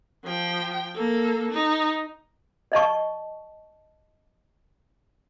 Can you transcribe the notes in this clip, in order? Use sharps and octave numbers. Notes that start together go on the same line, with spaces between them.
F3 G5
A#3 A4
D#4
D5 D#5 A5 C#6